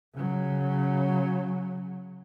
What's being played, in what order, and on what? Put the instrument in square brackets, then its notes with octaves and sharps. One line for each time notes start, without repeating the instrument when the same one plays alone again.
[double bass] C#3 F#3